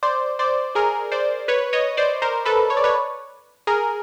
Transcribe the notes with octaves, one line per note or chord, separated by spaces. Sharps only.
C5 D5
C5 D5
G#4 A#4
C5 D5
B4 C#5
C#5 D#5
C5 D5
A#4 C5
A4 B4
C#5
D5
B4 C#5
G#4 A#4